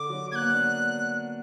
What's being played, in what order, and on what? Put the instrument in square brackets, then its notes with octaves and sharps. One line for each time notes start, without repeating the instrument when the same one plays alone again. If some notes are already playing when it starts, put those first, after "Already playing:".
Already playing: [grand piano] D3 [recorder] D6
[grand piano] F#3
[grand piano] A#3 [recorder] G#6
[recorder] F#6
[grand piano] B3
D4